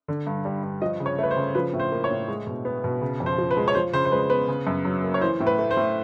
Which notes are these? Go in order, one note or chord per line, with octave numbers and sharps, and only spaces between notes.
D3
G2
G3
G2
F3 D#5
C#3
C#5
A3 B4
C5
C#3
F3 B4
A2
C5
A#3
C#5
A2
G#3
B2
B3
B2
C#3
F2
C5
F3
B4
G#3
C#5
F3 C5
C#3 C5
C5
G#3 B4
B3 B4
C#3
F#2
F#3
A#3
C#5
E3 C5
A2
B4
A3
C5
A2